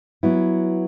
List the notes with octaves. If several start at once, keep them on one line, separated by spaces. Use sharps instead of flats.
F#3 B3 E4